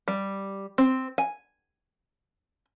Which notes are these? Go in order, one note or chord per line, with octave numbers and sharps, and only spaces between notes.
G3
C4
G#5